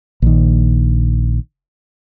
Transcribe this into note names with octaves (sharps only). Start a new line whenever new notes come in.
A#1 D#3